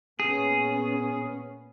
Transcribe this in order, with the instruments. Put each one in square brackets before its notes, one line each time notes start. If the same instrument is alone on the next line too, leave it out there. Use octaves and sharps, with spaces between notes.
[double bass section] A#2 B3 C#4 [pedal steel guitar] G#4